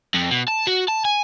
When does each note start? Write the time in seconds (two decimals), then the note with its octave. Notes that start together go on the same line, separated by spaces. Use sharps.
0.14 F2
0.31 B2
0.48 A5
0.67 F#4
0.88 A5
1.05 G#5